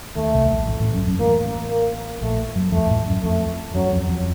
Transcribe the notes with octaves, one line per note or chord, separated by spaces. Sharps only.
D#2 D#3 A3
C2 C3
A#1 A#2
A1 A2
A1 A2
F#2
F#2
A1 A2 A#3
A#3
A#1 A#2 A3
F#2 F#3
F2 F3 A3
A1 A2
F#2
F2 A3
F#2 F#3
F2
F2